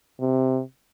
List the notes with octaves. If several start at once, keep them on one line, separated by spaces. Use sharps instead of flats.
C3